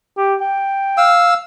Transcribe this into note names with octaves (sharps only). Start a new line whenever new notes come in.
G4
G5
F5 E6